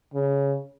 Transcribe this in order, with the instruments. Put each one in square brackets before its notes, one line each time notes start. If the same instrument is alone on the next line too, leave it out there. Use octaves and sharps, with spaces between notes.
[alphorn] C#3